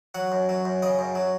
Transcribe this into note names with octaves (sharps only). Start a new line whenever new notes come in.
F#3 F#5
F#2
F#3
F#2
C#3 D#5
F#2
F#3